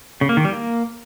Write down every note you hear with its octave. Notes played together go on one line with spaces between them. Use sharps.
C#3
A#3
D#3
G3
A#3